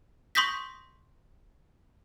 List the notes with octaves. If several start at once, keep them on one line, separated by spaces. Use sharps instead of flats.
C6 C#6 D#6 G6 A#6 B6